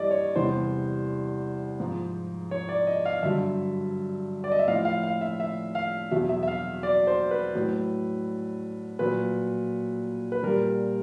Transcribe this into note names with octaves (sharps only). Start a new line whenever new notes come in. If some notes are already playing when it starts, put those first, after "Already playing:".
Already playing: G2 E3 G3 D5 D#5
C#5
E2 C3 E3 G3 C5
G#2 F3
C#5
D5
D#5
F5
G2 D3 F#3 E5
D5
D#5
E5
A2 F3 F5
F5
F5
E5
E5
F5
E2 B2 F#3 E5
E5
E5
F5
D5
C5
B4
A2 F#3
A#2 F#3 B4
B4
A#2 G3 A#4